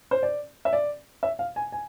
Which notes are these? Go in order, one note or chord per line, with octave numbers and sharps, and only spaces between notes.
C5
D5
E5
D5
E5
F5
G#5
G#5